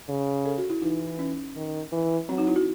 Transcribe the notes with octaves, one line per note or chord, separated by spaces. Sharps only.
C#3
A4
F#4
E4
E3 D#4
C#4
D#3
E3
F#3 C4
D#4
E4
F#4